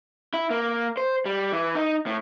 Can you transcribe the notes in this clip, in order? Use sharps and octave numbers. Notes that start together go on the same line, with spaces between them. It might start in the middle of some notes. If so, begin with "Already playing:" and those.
E4
A#3
C5
G3
E3
D#4
A2